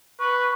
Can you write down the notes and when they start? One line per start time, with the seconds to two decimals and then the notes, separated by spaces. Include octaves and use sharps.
0.19 B4 C#6